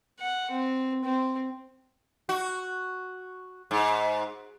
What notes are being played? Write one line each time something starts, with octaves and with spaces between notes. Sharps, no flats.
F#5
C4
C4
F#4
G#2